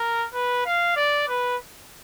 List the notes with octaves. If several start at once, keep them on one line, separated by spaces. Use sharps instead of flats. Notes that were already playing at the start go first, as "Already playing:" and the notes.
Already playing: A#4
B4
F5
D5
B4